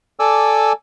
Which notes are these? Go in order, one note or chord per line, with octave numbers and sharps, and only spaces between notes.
A4 D5 G#5 D6 E6